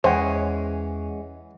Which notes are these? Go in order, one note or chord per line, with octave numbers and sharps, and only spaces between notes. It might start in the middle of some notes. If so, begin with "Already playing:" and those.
E2 E3 G#3 C#4 C5 F#5 G5